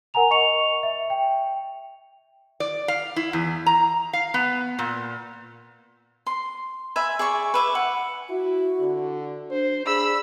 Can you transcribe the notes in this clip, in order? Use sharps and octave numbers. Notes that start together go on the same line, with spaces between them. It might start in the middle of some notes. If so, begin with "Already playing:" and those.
A#4 F#5 G#5 A#5 F7
D#5 C#6 C#7 F7
E5
G5
D5
F5
E4
E2
A#5
F5
B3
A#2
C6
E5 G#5 B5
G#4 D5 E5 C#6
B4 E5 D6
F#5
E4 F#4
D3
D4 C5
D4 G#4 B5 E6